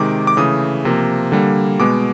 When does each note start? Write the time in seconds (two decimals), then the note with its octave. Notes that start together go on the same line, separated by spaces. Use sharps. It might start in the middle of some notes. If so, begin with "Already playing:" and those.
Already playing: C3 D#3 G#3 D6
0.27 D6
0.37 C#3 E3 A3 D#6
0.85 C3 F3 A#3
1.32 D3 G3 A#3
1.79 B2 G#3 B3 D6